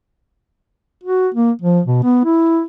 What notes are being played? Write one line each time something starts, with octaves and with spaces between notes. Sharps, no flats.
F#4
A#3
F3
B2
B3
E4